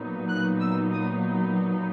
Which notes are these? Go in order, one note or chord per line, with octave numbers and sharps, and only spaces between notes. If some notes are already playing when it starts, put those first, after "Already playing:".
Already playing: A#2 F#3 B3 D#4
F#6
E6
D#6